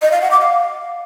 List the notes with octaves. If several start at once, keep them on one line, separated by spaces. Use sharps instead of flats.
D#5
F5
F#5
D6
F5